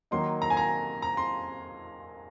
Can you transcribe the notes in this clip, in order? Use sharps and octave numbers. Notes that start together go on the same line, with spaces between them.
D#3 F#3 A#3 D#4 C6
A#5
G#5
A#5
A#5
C6